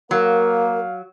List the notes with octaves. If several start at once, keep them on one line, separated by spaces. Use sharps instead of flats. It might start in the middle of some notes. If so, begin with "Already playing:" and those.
F#3 A#3 A#4 F5